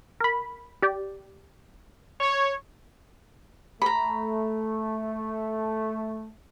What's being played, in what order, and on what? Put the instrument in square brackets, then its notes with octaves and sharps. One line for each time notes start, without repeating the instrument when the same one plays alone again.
[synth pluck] A#4 B5
G4 D5
[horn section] C#5
[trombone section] A3 [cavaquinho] A#5 B5